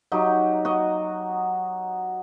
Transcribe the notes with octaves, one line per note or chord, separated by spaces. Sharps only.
F#3 D#4 G4
F#4 D#5